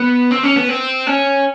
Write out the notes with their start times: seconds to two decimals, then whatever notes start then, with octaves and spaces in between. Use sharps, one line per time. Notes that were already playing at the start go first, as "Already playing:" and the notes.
Already playing: B3
0.31 C4
0.43 C#4
0.56 B3
0.69 C4
1.07 C#4